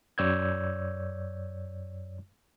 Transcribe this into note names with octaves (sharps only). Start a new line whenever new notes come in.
F#2 C#5 D5 E6 G6 G#6